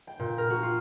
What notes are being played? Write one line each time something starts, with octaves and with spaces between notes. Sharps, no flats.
G5
A#2
A#4
F#4
F4